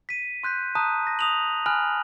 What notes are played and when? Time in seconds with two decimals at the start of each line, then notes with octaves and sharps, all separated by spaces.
0.09 B6 D#7
0.43 C6 F#6 G6 B6
0.75 A5 A#5 D#6 F#6 D#7
1.07 A#6
1.19 D#6 F7 F#7
1.66 G#5 B5 F6 F#6 F#7